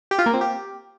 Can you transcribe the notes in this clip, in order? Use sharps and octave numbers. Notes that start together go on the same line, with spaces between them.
G4
F4
A#3
C4
G4